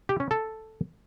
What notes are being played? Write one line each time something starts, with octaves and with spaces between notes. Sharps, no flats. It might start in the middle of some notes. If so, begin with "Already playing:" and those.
G4
C#4
A4